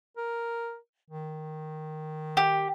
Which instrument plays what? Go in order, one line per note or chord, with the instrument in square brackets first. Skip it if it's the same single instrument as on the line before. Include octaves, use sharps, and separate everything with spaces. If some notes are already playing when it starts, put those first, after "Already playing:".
[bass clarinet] A#4
D#3
[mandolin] G4